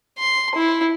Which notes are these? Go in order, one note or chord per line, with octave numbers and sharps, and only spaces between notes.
C6
E4